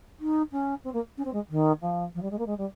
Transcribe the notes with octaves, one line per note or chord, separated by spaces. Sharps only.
D#4
C#4
C4
A#3
C#4
C4
G#3
D#3
F3
F3
G3
G#3
A#3
G#3
G3